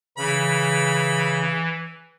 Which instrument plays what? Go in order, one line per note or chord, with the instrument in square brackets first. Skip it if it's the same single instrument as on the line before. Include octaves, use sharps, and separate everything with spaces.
[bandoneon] C#3 [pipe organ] E3 [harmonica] B5